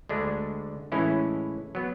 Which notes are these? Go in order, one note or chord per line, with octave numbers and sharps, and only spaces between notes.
D2 D3 G#3 D4
A2 E3 G#3 C#4 E4
F#3 B3